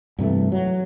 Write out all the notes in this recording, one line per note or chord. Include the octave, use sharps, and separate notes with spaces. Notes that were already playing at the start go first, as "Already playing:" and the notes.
G2 C3 E3 A3
F#3